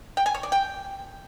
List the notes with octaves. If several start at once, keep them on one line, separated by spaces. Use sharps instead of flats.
G5
G#5
C#5
D5
G5